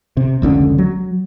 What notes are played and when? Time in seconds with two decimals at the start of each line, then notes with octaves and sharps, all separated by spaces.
0.17 C3
0.42 F1 C#2 D3 C#4
0.78 F#3